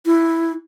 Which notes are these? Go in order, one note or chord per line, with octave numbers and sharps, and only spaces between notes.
E4